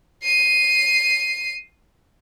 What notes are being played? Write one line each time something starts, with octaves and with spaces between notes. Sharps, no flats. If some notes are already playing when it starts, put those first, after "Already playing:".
C7 D#7